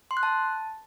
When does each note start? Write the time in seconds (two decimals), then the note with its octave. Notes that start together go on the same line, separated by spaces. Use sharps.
0.11 C6
0.17 F#6
0.23 A5